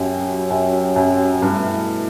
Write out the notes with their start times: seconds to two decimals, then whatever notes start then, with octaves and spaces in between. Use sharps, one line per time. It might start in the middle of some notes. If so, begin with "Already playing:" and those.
Already playing: F#2 F#3 C#4 G4
0.50 F#2
0.96 F#2
1.42 G2 B2 A3 E4